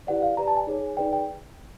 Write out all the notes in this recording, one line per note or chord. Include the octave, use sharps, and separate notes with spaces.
E4 G4 B4 D5 F#5
F5
G4 B4 D5 A#5
A5
G#5
D#4 G#4 C#5
D#4 G#4 B4 D5 G5
G5